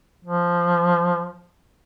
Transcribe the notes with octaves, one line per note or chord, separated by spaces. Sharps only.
F3